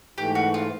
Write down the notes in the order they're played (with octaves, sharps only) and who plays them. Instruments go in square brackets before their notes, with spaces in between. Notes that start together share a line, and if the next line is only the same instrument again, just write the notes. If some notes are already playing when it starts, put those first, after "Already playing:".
[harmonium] G#2 E3 A3 [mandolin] G4
[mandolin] F#4
F4